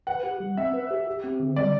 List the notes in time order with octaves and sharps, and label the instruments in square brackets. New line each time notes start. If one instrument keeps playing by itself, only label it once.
[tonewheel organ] B4 [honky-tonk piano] F#5
[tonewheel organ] G4
G3
[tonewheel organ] C4 [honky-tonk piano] E5
[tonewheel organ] B4
G4
G4
C4
D3
[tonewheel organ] G3 [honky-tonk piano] D5